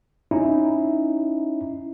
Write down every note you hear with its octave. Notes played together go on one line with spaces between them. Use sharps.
C#4 D#4 E4